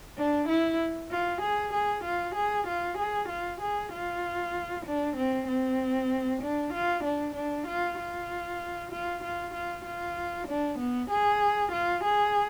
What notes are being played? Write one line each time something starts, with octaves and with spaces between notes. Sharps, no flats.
D4
E4
F4
G#4
G#4
F4
G#4
F4
G#4
F4
G#4
F4
D4
C4
C4
D4
F4
D4
D4
F4
F4
F4
F4
F4
F4
D4
B3
G#4
F4
G#4